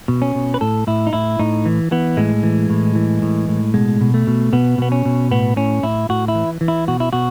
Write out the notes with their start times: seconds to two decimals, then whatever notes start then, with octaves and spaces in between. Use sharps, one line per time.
0.08 B2
0.22 C#4
0.35 B2
0.54 B4
0.61 A2 A4
0.87 A2 E4
1.07 D#4
1.13 A2 E4
1.39 A2 D#4
1.66 E3
1.92 E3 B3
2.17 A2 G#3
2.43 E3
2.70 A2
2.96 E3
3.22 A2
3.49 A2
3.74 B2 G#3
4.01 B2
4.14 A3
4.27 B2
4.53 B2 B3
4.78 B2 B3
4.92 C#4
5.05 B2
5.31 A2 B3
5.56 A2 C#4
5.83 A2 E4
6.09 A2 F#4
6.28 E4
6.35 E3
6.61 E3
6.68 E4
6.88 B2 F#4
7.00 E4
7.13 B2 F#4